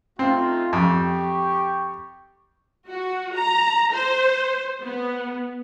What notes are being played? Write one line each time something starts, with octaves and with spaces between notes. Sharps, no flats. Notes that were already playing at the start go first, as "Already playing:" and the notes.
A3 C4 D#4 F4
F2 G4 C#6
F#4
A#5
C5
B3